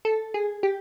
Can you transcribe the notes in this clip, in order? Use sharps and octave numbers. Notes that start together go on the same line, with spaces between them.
A4
G#4
G4